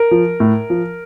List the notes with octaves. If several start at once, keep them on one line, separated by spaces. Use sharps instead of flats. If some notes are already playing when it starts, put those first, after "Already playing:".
Already playing: A#4
F3
A2
F3